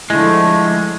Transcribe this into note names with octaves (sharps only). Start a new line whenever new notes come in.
D3 F3 G#3 A3 E4